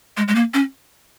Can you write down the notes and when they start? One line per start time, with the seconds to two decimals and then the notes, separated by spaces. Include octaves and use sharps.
0.17 G#3
0.28 G#3
0.35 A#3
0.54 C#4